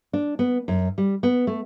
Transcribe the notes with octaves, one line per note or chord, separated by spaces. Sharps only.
D4
B3
F#2
G3
B3
A3